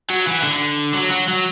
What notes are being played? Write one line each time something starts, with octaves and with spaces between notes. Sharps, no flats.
F#3
E3
D3
F#3
F#3
F#3